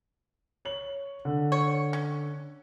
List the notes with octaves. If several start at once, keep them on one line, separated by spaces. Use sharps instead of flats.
C#5 F#7
D3
C#5
C#4